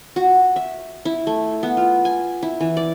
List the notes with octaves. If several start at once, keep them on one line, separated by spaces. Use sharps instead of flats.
F#4
E5
E4
A3
B3
F4
G#5
E4
E3
D5